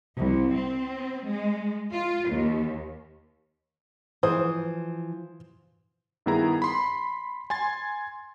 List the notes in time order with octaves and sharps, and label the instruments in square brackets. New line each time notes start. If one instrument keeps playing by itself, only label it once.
[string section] C2
C4
G#3
F4
D#2
[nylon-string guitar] E3 F3 [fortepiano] C5 D#6
[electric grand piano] G2 D#3 B3 E4 G#4 A#5
B5 C6
G#5 C6 A6